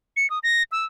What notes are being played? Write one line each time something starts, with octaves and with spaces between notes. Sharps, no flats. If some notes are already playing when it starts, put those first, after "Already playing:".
C#7
D#6
A#6
E6